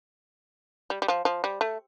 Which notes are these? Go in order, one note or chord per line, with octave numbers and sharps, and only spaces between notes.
G3
G3
F3
F3
G3
A3